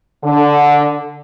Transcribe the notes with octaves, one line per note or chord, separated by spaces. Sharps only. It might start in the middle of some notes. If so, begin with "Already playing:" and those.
D3